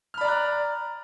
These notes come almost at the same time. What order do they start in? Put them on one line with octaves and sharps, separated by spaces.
F6 B5 D5 A#5 F#6